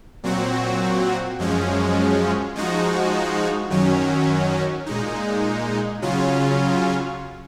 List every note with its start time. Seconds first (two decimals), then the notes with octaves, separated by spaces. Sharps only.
0.23 A#2 F#3 C4 F#4
1.39 F#2 F3 G#3 C#4
2.55 F3 G#3 D#4 F#4
3.70 F#2 D#3 F#3 C#4
4.86 A#2 G#3 D#4
6.02 C#3 F#3 C#4 F4